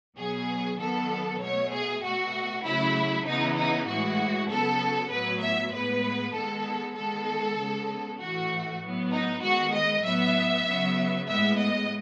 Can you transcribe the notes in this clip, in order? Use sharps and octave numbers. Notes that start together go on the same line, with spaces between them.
B2 F#3 B3 G#4
D#3 F#3 B3 A4
B2 A3 C#5
G#4
B2 A3 F#4
C#3 F#3 A3 E4
C#3 E3 B3 D#4
D#4
A2 E3 G#3 F#4
C#3 F#3 B3 A4
A2 F#3 B3 B4
E5
A2 G#3 B3 B4
D#3 G#3 B3 A4
D#3 G#3 B3 A4
C#3 G#3 B3
A2 E3 A3 F#4
A2 F#3 B3
D#4
D#3 G#3 B3 F#4
D#5
A2 F#3 B3 E5
C#3 F#3 B3
A2 G#3 B3 E5
D#5